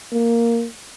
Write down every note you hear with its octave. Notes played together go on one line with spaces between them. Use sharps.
A#3